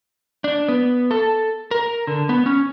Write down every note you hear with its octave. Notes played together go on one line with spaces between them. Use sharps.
D4
B3
A4
A#4
D3
B3
C#4